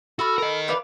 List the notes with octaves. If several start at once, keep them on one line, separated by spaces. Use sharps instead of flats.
F#4 A4 B5 F6
A#4 D#5
B4 D5 F5